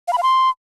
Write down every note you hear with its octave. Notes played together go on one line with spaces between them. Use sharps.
F5
B5
F5
C6